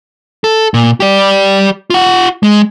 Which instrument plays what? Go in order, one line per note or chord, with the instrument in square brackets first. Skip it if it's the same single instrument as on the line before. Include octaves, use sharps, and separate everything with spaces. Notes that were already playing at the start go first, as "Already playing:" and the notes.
[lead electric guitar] A4
A#2
G4 D5
F4 F#5
G#3